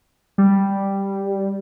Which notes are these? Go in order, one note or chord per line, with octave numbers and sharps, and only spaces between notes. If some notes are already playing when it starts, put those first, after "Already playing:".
G3